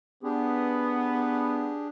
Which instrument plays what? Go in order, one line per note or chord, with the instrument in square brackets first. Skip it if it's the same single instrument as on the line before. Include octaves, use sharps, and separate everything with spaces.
[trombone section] B3 [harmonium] D4 G4 G#4